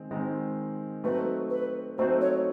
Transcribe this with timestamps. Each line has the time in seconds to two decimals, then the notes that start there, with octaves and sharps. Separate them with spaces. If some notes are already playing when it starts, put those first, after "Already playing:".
Already playing: D#3 G#3 C4
0.11 D#3 G#3 C4
1.04 F#3 A3 C4 D#4 F#4 B4
1.50 B4
1.98 F#3 A3 C4 D#4 F#4 C5
2.21 C#5